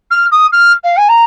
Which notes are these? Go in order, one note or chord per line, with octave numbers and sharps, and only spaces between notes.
F6
D#6
F6
F5
G#5
A#5